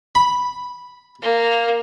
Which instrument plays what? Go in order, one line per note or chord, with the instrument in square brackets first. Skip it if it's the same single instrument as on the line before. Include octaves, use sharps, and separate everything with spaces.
[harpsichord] B5
[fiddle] A#3